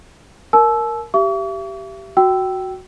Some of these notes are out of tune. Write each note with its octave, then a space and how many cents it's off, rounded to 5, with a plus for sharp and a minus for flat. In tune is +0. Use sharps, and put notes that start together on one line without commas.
A#4 +0 A5 -40 E6 +0
G4 -10 E5 +40 C#6 +45
F#4 +0 G5 -20 E6 +0